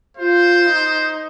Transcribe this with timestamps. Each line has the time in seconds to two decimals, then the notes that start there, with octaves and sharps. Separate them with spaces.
0.17 F4 C5
0.66 D#4